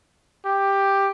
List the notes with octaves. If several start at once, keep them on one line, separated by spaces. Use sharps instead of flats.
G4